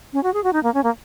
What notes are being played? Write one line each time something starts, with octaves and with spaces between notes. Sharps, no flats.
C#4
F#4
G#4
F#4
D#4
A#3
C#4
A#3